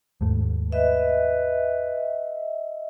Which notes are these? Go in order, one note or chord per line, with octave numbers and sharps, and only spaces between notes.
D#2 G#2 A3
B4 D#5 E5